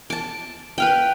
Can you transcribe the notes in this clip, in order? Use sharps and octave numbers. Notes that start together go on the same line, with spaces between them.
A5 D6
B4 F5 G5